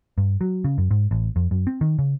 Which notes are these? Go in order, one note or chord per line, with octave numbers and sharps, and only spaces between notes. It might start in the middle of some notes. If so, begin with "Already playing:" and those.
G2
F#3
C#3
F#2
G#2
A1
F2
F#2
C4
D#3
C#3